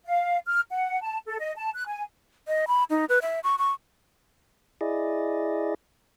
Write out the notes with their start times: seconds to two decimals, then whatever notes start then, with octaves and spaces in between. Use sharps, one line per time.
0.05 F5
0.45 F6
0.70 F#5
1.01 A5
1.27 A4
1.39 D#5
1.56 A5
1.74 F#6
1.86 G#5
2.48 D#5
2.68 B5
2.90 D#4
3.09 B4
3.22 E5
3.44 C#6
3.59 C#6
4.81 E4 G#4 D5 D#5